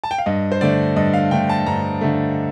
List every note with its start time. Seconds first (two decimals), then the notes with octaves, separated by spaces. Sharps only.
0.04 A5
0.11 G5
0.18 F5
0.26 G2 D#5
0.52 C5
0.61 D3 A3 D5
0.96 G2 D#5
1.13 F5
1.31 D3 A3 G5
1.49 A5
1.66 G2 A#5
2.01 D3 A3